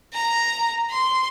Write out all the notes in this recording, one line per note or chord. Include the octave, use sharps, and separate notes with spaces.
A#5
C6